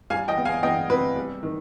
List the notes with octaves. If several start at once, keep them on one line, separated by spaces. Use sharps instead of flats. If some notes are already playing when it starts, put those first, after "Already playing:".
G3 F5 G#5
D#5 G5
B3
F5 G#5
B3 D#5 G5
C3 B4
G3
D#3